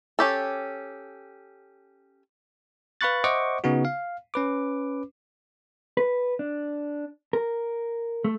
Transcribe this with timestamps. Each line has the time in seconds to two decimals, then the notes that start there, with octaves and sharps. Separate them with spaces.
0.19 C#4 G4 A4
3.01 B4 F5 B5 C#6 F#6 A6
3.24 C5 D#5 E5 F#5 C#6 D6
3.64 C#3 B3 D#4 F#4
3.85 F5
4.34 C#4 B4 D6
5.97 B4
6.39 D4
7.33 A#4
8.24 A3